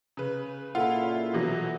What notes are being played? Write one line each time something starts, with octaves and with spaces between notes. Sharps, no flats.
C#3 B4
A#2 C#3 E4 F4 A4 F#5
B2 E3 F#3